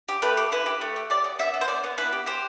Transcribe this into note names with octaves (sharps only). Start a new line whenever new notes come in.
G4
A3 B4
G4
E4 B4
G4
A3
G4
G4 D5
B3
B3 E5
B3
C5
B3 D5
B3
E4 B4
G4
G4 C5